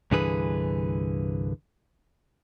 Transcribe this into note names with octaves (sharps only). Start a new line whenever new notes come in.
C2 G2 D3 E3 G#4 B4